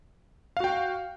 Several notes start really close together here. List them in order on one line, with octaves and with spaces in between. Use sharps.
F5 F#4 G5